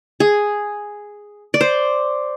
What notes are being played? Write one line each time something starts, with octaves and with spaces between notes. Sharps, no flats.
G#4
D5
C5